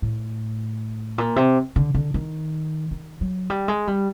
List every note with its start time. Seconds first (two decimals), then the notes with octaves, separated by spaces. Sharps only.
0.02 A2
1.18 A#2
1.36 C3
1.76 D3
1.95 D3
2.14 D#3
2.91 D#3
3.21 F#3
3.50 G3
3.68 G#3
3.87 G3